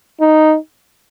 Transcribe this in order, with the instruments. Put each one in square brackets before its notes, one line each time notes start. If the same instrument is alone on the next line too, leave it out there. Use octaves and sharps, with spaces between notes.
[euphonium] D#4